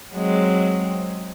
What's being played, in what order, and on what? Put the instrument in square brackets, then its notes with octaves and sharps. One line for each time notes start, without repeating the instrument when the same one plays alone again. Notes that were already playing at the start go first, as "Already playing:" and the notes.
[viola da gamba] F#3 G#3 C4